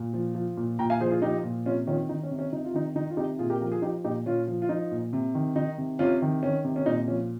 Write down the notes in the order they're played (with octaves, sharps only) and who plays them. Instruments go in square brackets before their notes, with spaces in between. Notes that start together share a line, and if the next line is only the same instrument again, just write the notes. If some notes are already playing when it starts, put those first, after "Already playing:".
Already playing: [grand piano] A#2
F3
F3
A#2
A#2 G5 A#5
F5 G#5
F3 G#4 C5
F4 G#4
F3 D#4 G4
A#2
C3 C#4 F4
D#3 C#4 F4
D#3 D#4
C#4
C3
C#4
C3 D#4
F4
D#3 D#4
D#3 D#4
F4
C3 D#4 G4
A#2 F4 G#4
G4 A#4
F3 G4 A#4
F4 G#4
F3 D#4 G4
A#2 D#4 G4
A#2 C#4 F4
F3
F4
F3 D#4
A#2
C3
D#3
D#3 D#4
C3
C3 C#4 F4
D#3
D#3 C#4
C3
C#4
A#2 D#4
F3 C#4